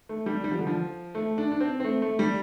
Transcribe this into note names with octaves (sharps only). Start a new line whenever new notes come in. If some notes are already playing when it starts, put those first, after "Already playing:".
A3
G3
G3
F3
D3
F3
A3
D4
D4
C4
C4
A3
A3
G3